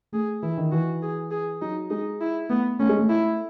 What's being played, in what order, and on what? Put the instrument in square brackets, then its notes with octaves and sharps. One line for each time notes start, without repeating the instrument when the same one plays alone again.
[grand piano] A3 [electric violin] G#4
[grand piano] E3 [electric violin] E4
[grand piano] D#3
[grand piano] E3 [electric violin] F#4
[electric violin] G#4
G#4
[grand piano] F#3 [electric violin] D#4
[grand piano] G#3 [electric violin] D#4
[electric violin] E4
[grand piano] A3 [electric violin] B3
[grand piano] A3 [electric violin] C#4
[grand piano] G#3
A3
[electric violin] E4